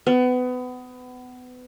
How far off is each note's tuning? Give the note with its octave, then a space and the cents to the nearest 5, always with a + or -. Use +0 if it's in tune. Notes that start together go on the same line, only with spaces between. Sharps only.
B3 +25